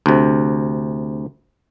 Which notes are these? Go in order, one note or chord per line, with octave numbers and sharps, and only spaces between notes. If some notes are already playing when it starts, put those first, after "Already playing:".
D2 C3